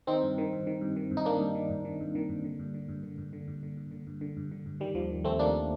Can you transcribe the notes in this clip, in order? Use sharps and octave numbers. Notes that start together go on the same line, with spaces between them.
D#3 C4 D#4
G2
D#3
G2
D#3
G2
D#3
G2
D#4
D#3 A#3 D4
G2
D#3
G2
D#3
G2
D#3
G2
D3
G2
D3
G2
D3
G2
D3
G2
D3
G2
D3
G2
D3
G2
D3
G2
D#3 G3
D#2 F3
D#3
D#2 A3 C4
D#3 A#3 D4